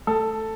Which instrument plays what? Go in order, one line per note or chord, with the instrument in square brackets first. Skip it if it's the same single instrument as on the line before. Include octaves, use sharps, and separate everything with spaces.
[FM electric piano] A3 [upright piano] A4